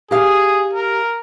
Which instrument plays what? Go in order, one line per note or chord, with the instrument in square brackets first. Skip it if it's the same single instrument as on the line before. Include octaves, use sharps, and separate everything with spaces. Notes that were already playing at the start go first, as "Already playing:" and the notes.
[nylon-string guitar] G4 F5 [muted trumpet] G#4
[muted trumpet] A#4